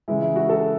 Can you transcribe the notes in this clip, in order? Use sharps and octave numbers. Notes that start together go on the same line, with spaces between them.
C#3 E3 G#3 E4
E4
F#4
A4